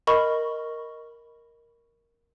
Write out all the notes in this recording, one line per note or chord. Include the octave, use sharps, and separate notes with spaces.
A#4 D#5 B5 C#6